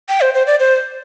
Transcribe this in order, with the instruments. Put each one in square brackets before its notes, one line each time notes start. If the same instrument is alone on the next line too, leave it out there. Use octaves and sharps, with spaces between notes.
[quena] G5
C5
C5
D5
C5